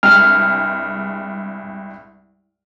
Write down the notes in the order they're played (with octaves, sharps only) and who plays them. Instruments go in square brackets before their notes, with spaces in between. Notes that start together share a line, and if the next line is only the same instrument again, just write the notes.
[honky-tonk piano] C2 G2 G#3 [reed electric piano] F6